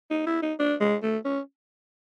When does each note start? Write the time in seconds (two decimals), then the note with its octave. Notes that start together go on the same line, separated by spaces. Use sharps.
0.11 D#4
0.27 E4
0.42 D#4
0.60 D4
0.81 G#3
1.03 A3
1.25 C#4